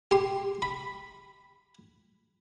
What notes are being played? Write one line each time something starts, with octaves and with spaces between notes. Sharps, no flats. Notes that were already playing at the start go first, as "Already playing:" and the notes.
G4 C6
B5